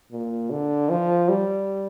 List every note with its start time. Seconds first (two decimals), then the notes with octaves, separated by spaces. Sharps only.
0.11 A#2
0.51 D3
0.90 F3
1.29 G3